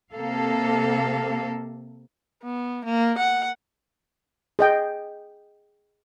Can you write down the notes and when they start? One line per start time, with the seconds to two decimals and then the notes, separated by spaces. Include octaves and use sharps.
0.13 C3 A#3 A4 F5
2.43 B3
2.85 A#3
3.18 F#5
4.59 G#4 D#5 G5